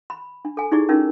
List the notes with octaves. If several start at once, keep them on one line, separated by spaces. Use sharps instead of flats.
B5
D4
A4 G#5
D#4 E4 G4 G#4 D5
C#4 D#4 F4 A#4